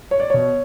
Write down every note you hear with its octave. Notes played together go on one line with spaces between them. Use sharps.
C#5
D5
B2 C#5